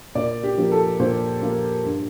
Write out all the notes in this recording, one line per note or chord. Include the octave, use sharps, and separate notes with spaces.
A#2 D5
G4
F3 A#3
A4
A#2 C5
F3 A#3
G2